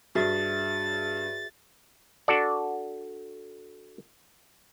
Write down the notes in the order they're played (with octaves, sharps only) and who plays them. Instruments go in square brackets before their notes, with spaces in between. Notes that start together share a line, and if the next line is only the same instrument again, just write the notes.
[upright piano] G2 [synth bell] F#4 G#4 E5 [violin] A6
[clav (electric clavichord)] D4 F#4 A4 D5